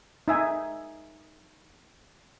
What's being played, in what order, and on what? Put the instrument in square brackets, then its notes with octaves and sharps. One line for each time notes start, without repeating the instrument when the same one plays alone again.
[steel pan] D#4 E5 G#5